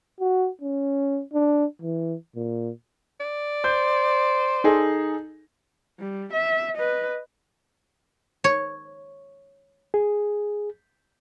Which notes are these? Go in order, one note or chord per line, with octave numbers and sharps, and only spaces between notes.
F#4
C#4
D4
E3
A#2
D5
C5 G6
D#4 G#4 A4
G3
E5
B4 D#5
C#5
G#4